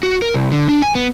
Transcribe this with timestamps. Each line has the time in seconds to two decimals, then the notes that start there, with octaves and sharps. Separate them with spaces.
0.03 F#4
0.22 A#4
0.34 C2
0.52 D3
0.69 D4
0.82 G#5
0.95 B3